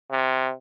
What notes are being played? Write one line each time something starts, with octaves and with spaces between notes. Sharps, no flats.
C3